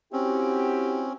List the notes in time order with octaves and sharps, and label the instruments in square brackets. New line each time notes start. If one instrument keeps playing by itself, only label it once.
[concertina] C4 C#4 [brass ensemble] E4 F#4 G4